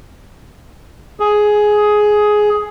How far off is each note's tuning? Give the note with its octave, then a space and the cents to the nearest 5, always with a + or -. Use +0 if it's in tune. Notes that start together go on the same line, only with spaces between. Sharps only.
G#4 +10